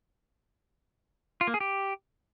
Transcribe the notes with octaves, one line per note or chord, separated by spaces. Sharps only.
F4
A#3
G#4
G4